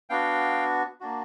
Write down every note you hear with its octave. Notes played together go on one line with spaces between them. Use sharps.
B3 D4 F#4 F5 G5
A#3 D4 F#4